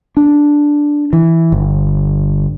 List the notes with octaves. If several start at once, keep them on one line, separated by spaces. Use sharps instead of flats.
D4
E3
G1